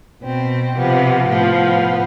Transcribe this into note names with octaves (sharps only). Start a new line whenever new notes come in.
B2 C4
C3 F3 B3
A2 F3 B3